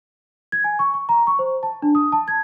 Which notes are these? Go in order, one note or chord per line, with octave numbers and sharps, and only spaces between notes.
G#6
G#5
C#6
C#6
A#5
C#6
C5
A5
D4
D#6
A5
G#6